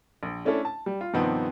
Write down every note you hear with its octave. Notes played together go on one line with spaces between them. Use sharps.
A#1
A3 C#4 D4 E4 A4
A5
G3
F4
G2 C3 D#3 F3 B3 C4